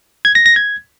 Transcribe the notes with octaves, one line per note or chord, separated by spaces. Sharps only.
G#6
A#6
A#6
G#6